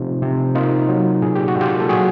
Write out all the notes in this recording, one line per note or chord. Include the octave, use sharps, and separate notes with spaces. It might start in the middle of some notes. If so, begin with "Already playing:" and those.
Already playing: C3 F3 A3 D#4 F4
C3
A#3 D#4 F4
F#3
A#2 G#4
G4
F#4
A#2 F4 G4
A4
F#3 F#4 G#4